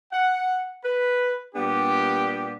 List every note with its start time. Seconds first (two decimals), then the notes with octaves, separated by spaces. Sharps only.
0.12 F#5
0.83 B4
1.54 A#2 G3 B3 D4 G4